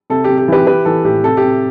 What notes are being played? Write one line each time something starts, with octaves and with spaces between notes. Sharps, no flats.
C3 A4
C3 G4
G4
E3 G4 B4
E3 G4 B4
E3 A4
A2 G4
C3 A4
G4
C3